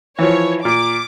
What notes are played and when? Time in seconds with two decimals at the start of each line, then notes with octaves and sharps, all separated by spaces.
0.19 E3 F3 C#5
0.65 A#2 D6